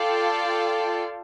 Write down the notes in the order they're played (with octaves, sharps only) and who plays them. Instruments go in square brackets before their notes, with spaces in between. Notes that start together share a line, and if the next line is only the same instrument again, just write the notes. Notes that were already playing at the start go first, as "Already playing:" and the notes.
Already playing: [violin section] F4 A4 D5 G5